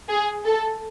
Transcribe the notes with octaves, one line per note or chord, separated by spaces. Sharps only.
G#4
A4